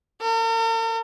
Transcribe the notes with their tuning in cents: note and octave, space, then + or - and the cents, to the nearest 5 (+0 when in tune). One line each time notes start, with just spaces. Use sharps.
A#4 -45